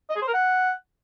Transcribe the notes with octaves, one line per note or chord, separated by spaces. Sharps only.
D#5
G#4
C5
A#4
F#5